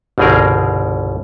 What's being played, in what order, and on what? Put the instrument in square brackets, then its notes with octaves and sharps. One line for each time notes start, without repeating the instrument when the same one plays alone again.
[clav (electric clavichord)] G1 C2 B2 C4 G#4 A#4